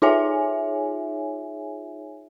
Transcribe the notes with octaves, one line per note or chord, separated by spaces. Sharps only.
D#4 F4 G#4 C#5 E5 G#5